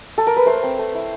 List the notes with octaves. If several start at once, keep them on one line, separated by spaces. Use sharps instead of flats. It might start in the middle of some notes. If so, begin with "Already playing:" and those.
A4
A#4
B4
A3 C5
C4
A3
E4